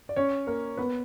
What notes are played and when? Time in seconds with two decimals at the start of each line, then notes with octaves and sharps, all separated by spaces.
0.09 D5
0.16 C#4 C#5
0.47 A#3 A#4
0.77 B3 B4